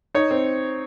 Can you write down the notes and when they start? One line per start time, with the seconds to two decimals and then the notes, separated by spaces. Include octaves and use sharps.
0.15 D#4 C#5
0.31 C4